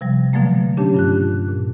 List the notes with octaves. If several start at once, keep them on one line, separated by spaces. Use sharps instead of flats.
C3 F3 G3
B2 D3 F3 F#3 A3 A#3
C#4 D4 G4 C#5 A5
G2 F4 F#6
A#2